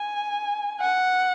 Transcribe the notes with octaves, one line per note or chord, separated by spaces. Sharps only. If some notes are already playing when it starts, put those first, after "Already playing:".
Already playing: G#5
F#5